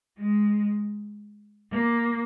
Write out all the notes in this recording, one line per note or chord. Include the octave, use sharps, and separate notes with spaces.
G#3
A#3